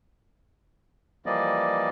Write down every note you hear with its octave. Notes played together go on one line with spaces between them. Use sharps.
E3 F3 G3 A#3 D5 D#5